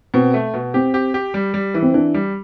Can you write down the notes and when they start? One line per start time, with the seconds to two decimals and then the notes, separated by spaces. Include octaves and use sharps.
0.14 B2 C4
0.34 A3
0.54 B2
0.74 C4 G4
0.94 G4
1.14 G4
1.34 G3
1.54 G3
1.74 E3
1.82 C4
1.94 E3 D4
2.14 G3